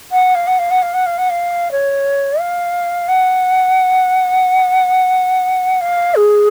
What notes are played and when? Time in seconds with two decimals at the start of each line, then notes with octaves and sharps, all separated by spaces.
0.12 F#5
0.35 F5
0.47 F#5
0.59 F5
0.71 F#5
0.82 F5
0.94 F#5
1.06 F5
1.18 F#5
1.30 F5
1.72 C#5
2.40 F5
3.08 F#5
5.81 F5
6.16 G#4